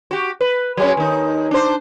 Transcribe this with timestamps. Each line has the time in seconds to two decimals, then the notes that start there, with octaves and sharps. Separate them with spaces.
0.11 F#4 G4
0.41 B4
0.77 F#3 G#3 C#4
0.97 D#2 D#4
1.51 D4 C5